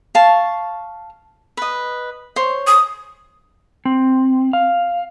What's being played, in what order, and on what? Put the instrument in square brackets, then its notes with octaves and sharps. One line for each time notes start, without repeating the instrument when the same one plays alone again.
[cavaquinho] F5 A5 C#6
B4 D#5
C5 C#5
[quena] D#6
[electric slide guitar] C4
F5